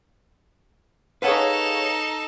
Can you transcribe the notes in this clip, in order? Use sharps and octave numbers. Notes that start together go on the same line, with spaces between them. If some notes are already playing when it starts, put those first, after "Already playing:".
D#4 G#4 A4 B4 C#5 F5 F#5